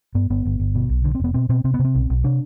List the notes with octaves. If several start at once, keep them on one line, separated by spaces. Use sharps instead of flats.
G2 B3
G1 B3
G1
G1
B2
B1
D3
C4
F1 B3
B2 C4
B2 C4
C3 C4
B3
C3
C4
B1
B1
C3 D4